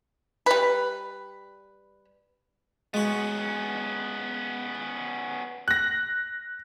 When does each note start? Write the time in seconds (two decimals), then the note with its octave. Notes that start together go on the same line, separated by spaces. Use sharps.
0.46 G3 B4
2.94 G#3 B3 C#4 F#4
5.68 F#6 A#6